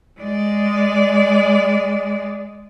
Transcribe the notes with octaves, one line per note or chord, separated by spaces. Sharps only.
G#3 D5